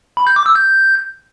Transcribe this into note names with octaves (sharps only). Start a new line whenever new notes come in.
B5
G6
D6
E6
G6